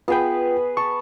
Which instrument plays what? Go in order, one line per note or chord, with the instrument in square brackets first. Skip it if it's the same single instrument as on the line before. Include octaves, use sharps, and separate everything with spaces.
[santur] B3 G#4 B4 [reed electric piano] F4 G5
[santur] A5 [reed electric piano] C#6